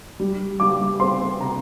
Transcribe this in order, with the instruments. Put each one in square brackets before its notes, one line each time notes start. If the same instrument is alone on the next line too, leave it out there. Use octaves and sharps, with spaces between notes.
[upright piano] G3
G3 D6
C4 C6
C3 A#5